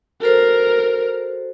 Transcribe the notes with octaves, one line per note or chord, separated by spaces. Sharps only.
F#4 A4 A#4 C5